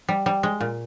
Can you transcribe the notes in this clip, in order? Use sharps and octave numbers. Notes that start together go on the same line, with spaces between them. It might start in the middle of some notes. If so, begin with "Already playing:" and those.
G3
G3
G#3
A#2